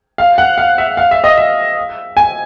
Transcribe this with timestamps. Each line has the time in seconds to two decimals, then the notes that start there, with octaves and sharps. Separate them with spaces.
0.18 F5
0.38 F#5
0.58 F5
0.78 E5
0.97 F5
1.11 E5
1.24 D#5
1.37 E5
2.17 G#5